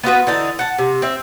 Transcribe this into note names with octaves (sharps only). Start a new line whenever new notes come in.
B3 F4 F#4 B4
D3 E3 D#4 A5
F#5 A5
C3
C4 E5